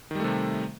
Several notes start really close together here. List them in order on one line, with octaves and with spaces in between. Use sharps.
D#3 G3 A3 C3